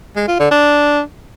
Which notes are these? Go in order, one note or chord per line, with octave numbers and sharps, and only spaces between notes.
G#3
F4
D3
D4